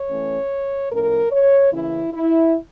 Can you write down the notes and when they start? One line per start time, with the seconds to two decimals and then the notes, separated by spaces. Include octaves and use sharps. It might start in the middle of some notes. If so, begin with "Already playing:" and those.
Already playing: C#5
0.10 E3 A3 C#4
0.91 A2 F3 A3 C#4 A#4
1.32 C#5
1.72 C#3 E3 A#3 C#4 E4
2.13 E4